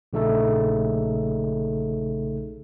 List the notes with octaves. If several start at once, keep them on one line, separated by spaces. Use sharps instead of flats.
A#1 C#3 A3 D#4 A4